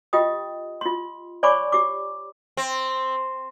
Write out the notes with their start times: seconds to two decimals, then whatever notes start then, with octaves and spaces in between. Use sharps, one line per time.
0.13 F4 G4 D#5 G5 D#6
0.81 F4 C6
1.43 C#5 D5 G#5 B5 C#6 D6
1.72 G4 D6
2.57 C4